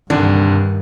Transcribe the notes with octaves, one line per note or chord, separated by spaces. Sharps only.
C2 G2 D3 D#3 D4